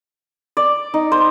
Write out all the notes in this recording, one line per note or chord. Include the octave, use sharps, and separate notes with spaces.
D5
D#4
C5